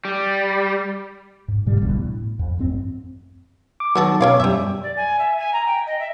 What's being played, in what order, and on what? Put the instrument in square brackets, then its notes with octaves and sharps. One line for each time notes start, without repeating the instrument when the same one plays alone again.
[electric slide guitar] G3
[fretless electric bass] G#2
G#2 B2 D3 G3
D#1 A1 G2 B2
A2
F2
A1 F#2 C4
[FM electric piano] D6
[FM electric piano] D#3 F#3 [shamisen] B3 F#4 A4
[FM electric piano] B2 D6 [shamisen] C#4 C#5 F5
[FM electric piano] F#2 G3 [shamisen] G4 E5
[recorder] D5
G#5
E5
G#5
A#5
G5
D#5
E5